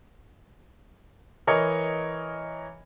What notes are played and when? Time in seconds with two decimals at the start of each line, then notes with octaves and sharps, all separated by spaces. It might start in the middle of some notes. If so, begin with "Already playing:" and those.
1.47 E3 A#4 C#5 D#5